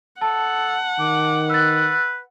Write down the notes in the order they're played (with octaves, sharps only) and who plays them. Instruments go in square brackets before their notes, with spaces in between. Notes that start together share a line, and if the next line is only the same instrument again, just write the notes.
[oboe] A4 [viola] F#5 [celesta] A5
[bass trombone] D#3 [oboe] D6
[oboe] B4 [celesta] E6 F#6 A6